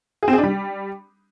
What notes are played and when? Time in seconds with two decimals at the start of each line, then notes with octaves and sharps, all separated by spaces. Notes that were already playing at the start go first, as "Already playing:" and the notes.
0.23 G#4
0.28 C4
0.33 G#4
0.38 D4
0.43 G3